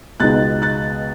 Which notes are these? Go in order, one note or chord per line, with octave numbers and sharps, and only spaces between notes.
C#2 B2 G#3 D#4 F#6 A6
F#6 A6